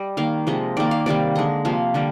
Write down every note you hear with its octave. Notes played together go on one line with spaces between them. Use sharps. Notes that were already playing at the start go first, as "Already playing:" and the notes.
Already playing: G3 D#5
D#3 A#3 F5
C3 F3 G#3 D#5
D#3 A#3 D5
F5
C3 D#3 G3 A#3 D5
D3 G#3 D#5
C3 F3 A#3 F5
D3 G3 A#3